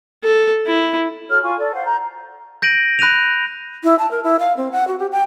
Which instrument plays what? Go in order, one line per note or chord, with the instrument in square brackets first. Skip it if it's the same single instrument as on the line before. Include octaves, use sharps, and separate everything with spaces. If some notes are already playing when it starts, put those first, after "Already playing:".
[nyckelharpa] A4
E4
[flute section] F#4 A4 C#5 F6
F4 G#5 C#6
A4 D5
C5 F5 F#5
A#5 G6
[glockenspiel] G6 A#6 D7 D#7 F#7
B5 F#6 A#6 D#7 F7
[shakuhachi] E4
A5
A#4
E4
F5
C4
F#5
F#4
G4
G5